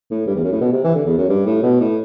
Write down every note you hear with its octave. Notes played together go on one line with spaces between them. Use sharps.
A2
G2
E2
F#2
A2
B2
C3
E3
D3
E2
F#2
G2
A2
B2
A2